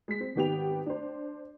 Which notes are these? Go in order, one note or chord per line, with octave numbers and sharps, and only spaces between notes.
G#3 B6
C4
G#1 D#3 B3 G4 G5 F7
D4 C5